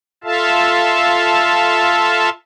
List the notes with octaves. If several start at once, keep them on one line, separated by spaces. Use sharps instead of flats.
F4 A4 E5 F5 A5